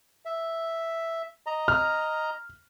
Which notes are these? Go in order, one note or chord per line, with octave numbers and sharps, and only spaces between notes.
E5
D#5 A#5
F6